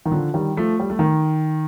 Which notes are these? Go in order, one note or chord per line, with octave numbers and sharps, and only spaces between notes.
D#3
D3 F3
D#3 G3
F3 A3
G3
A3
D#3